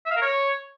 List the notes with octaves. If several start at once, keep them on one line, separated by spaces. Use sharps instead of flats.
E5
F5
A#4
C#5